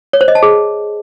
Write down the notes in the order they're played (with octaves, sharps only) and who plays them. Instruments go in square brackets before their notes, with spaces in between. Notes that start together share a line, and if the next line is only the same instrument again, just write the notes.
[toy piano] C#5
C5
D#5
A5
G#4